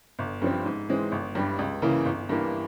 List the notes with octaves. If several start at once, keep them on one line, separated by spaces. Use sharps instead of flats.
G1
G2 F3 C4
G#2
E3 G#3 C4
G1
G2 G3
C#2
C#3 E3 A#3 E4
G1
G2 E3 A#3